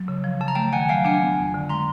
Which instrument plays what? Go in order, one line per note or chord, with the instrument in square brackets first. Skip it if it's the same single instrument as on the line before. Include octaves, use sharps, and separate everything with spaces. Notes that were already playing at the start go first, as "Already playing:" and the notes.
Already playing: [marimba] F#3
C#3
F3
[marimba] C#3 [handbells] A5
[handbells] A#5
[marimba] A3 [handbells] G5 A5
[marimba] D#3 [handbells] F#5 G#5
[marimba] F#3 [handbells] F5 G5
[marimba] D4 [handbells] F#5 G#5
[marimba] B3
F2
D3
[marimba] G#3 [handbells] A#5 C6